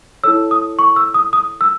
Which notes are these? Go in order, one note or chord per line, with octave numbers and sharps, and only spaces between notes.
E4 A4 C#5 E6
D#6
C#6
E6
D#6
D#6
E6